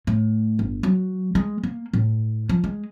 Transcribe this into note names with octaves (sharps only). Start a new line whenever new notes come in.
A2
G1
F#3
G#3
A#3
A2
F3
G#3